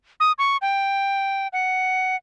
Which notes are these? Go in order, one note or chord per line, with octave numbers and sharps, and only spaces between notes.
D#6
C#6
G5
F#5